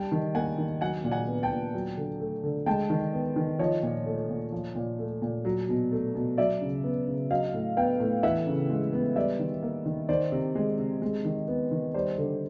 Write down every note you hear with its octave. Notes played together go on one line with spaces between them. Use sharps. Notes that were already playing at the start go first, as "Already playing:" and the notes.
Already playing: G3 G5 A5
D#3
A#3 F#5 G#5
D#3
F#3 F#5 G#5
A#2
F#5 G#5
B3
G5 A5
A#2
F#3
D3
A3
D3
G#3 G5 A5
D#3
B3
D#3
F3 C#5 D#5
A#2
A3
A#2
F3
A#2
A3
A#2
F#3
B2
A3
B2
F#3 D5 E5
C#3
B3
C#3
F#3 D#5 F5
A2
B3 F5 G5
A2
E3 E5 F#5
C#3
G#3
B3
G3 D5 E5
D#3
A#3
D#3
D#3 C5 D5
C3
G#3
C3
G#3
D#3
B3
D#3
G3 C5 D5
D3